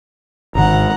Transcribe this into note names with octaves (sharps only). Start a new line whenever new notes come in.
G#1 C3 D#3 F#5 A#5